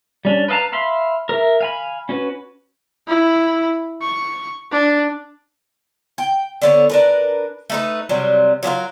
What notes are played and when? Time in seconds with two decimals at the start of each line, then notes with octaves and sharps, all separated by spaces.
0.25 G3 C#4 D4
0.48 B4 D#5 F5 A5 A#5
0.72 E5 F5 B5 C6
1.29 A#4 E5
1.61 F5 G#5 B5
2.09 C#4 F#4 B4
3.08 E4
4.02 C#6
4.72 D4
6.18 G5
6.62 D3 B3 C#5
6.90 D4 A#4 B4
7.70 A3 D#4 B4
8.09 C3 F#3 G3
8.63 F#3 D4 F4 A#4